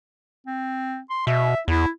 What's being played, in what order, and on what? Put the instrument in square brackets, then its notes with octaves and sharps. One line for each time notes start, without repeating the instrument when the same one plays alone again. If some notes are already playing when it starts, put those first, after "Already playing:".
[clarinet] C4
C6
[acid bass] B2 [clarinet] E5
[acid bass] E2 [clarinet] E4